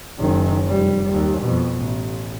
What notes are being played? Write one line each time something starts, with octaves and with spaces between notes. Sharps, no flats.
F#1 D#3
F1 G3
D#2
F2 B2
A1